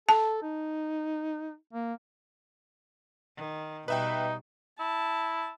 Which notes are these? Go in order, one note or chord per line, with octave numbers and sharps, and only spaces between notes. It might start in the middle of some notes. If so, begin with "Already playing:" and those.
A4 A5
D#4
A#3
D#3
B2 G3 D#4 B4 E5 G5
E4 A5